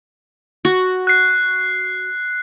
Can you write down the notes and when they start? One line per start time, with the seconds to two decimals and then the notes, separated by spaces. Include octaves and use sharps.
0.65 F#4
1.07 F#6 C7